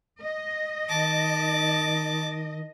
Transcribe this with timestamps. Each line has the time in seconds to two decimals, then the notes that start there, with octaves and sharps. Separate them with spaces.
0.22 D#5
0.90 D#3 A5 D6